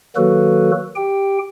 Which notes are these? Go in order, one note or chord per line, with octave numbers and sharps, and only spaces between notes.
D#3 F#3 A#3 F#4 A4 B4
G4 G5